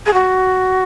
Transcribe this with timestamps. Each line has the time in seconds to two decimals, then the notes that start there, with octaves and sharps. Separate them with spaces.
0.06 G#4
0.13 F#4